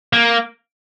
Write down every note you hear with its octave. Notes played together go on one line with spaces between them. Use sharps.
A#3